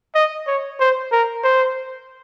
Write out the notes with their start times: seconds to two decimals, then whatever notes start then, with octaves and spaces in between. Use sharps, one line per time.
0.15 D#5
0.47 C#5
0.80 C5
1.12 A#4
1.44 C5